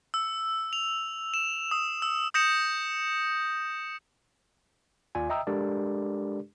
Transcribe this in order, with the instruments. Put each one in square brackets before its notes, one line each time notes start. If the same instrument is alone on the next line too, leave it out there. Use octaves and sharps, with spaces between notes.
[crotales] E6
F7
E7
D#6
E6
D#6 G6 A#6 C#7 E7
[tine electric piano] D#2 F4 D5 G#5
D#5 E5 G5 A#5 D#6 E6
G#3 D4 G4 A4 A#4 D5